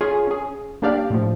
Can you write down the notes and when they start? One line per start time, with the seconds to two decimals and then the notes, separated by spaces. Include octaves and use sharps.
0.01 C#4 F4 G#4
0.27 C#4 G#4
0.82 A#3 D4 G4 D5 F5
1.10 A2 F3